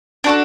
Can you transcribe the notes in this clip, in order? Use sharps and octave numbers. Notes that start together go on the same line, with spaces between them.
D4 F#4 A4